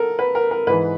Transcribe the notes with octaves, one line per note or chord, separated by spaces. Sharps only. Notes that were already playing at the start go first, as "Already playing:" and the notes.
Already playing: A4 A#4
B4
A#4
A#4
G#2 E3 B4